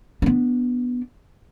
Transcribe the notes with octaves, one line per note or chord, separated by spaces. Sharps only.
B3 D4